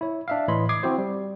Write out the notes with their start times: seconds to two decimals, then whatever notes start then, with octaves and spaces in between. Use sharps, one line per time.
0.01 E4 C#5
0.28 D4 E5 F5
0.48 A2 E3 C#5 D#5 B5 C6
0.69 D6 D#6 G#6 C7
0.83 C4 E4 F#4 C5
0.98 G3